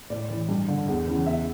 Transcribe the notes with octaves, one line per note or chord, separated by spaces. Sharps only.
A2 D5
E3
G2
D3
E2
C#3 E3
E2 E5